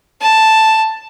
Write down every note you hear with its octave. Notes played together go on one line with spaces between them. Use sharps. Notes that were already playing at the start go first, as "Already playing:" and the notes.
A5